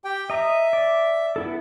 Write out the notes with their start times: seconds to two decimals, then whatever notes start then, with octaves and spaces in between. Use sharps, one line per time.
0.05 G4 G5
0.30 D#5 E5 A#5
0.73 D5
1.36 B3 E4 A4